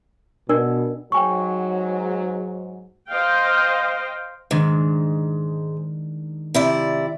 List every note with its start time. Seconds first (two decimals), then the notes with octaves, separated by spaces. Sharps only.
0.49 B2 D4 A#4 D5
1.12 G#2 F#3 G5 G#5 C#6
3.10 C5 D#5 F5 G5
4.51 G#2 D#3 G#3 D4
6.54 C3 E4 D5